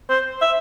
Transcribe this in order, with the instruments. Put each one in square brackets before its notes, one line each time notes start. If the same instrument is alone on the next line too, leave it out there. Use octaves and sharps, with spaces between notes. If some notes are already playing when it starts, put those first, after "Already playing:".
[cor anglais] C5
E5